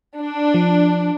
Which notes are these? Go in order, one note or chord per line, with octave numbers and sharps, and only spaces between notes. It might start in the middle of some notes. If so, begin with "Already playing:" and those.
D4
F3